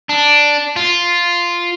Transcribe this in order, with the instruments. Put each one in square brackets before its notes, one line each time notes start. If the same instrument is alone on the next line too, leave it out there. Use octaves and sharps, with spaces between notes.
[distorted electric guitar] D4
F4